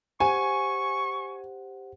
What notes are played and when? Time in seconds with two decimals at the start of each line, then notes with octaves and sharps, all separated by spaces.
0.20 G4 C5 F#5 G#5 C#6